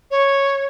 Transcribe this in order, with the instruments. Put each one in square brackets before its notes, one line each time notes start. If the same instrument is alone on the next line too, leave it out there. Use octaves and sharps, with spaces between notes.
[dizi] C#5